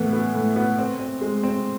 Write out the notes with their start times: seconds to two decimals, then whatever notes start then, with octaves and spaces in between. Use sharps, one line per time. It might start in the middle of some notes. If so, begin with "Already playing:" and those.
Already playing: A2 E3 B3
0.13 B3
0.35 A2
0.56 B3
0.79 C4
0.99 C4
1.21 G#3
1.43 C4